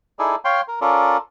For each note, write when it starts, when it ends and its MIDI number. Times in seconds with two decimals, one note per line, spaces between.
0.19 0.35 63
0.19 0.35 64
0.19 0.35 68
0.19 0.35 69
0.19 0.35 74
0.45 0.61 73
0.45 0.61 77
0.45 0.61 79
0.45 0.61 84
0.68 0.80 70
0.81 1.17 61
0.81 1.17 65
0.81 1.17 69
0.81 1.17 70
0.81 1.17 74